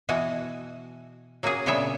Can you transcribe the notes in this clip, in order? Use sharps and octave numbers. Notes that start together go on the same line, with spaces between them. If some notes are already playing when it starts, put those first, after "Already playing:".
B2 E3 F#4 F#5 G#5
F#3 A#3 C#4 F#4 G#4
A#2 C#3 B3 D4 C#5 E5